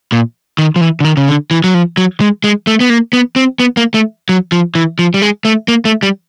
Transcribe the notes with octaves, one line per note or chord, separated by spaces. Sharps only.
A#2
D#3
F3
E3
D3
D#3
C#3
D3
E3
F#3
F3
F#3
G#3
G#3
A3
B3
A#3
B3
C4
B3
A#3
A3
F#3
F3
E3
F3
G3
G#3
A3
A#3
A3
G3